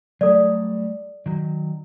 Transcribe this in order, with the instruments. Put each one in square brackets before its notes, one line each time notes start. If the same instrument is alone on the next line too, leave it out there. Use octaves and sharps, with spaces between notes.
[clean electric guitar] F#3 G3 A3 [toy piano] A4 D5
[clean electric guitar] D#3 F#3